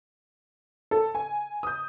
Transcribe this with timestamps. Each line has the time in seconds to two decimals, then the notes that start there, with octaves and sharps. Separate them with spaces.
0.91 A4
1.15 G#5
1.63 D#6 G6